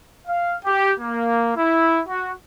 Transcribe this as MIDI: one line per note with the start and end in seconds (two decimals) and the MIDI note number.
0.27 0.57 77
0.65 0.93 67
1.00 1.54 58
1.57 1.99 64
2.08 2.31 66